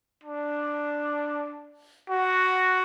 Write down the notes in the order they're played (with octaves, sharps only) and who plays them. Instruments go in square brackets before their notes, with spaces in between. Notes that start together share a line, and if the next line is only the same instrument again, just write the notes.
[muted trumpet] D4
F#4